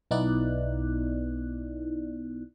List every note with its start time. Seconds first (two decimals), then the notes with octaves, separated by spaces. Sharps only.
0.11 B1 B3 D#4 E4 D5 F#6